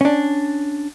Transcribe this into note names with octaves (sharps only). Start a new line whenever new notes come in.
C#4 D4